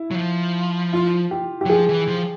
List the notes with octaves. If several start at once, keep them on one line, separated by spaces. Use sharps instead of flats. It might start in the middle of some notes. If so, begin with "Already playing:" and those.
Already playing: E4
F#3
F3
F4
G4
G4
F#3
F3 G#4
E3
F3